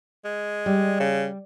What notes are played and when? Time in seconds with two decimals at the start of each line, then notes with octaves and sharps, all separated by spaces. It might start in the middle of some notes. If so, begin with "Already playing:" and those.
0.25 G#3
0.66 G3
1.00 C#3